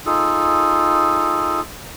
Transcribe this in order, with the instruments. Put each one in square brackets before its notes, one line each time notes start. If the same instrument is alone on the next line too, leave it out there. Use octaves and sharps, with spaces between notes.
[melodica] D#4 F4 G#4 A4